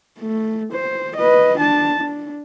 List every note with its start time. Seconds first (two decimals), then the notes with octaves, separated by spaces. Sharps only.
0.19 A3
0.73 C5
1.17 B4 D#5
1.59 D4 A5
2.00 D4